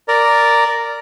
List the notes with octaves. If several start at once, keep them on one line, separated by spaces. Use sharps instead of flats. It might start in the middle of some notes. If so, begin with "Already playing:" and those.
A#4 D5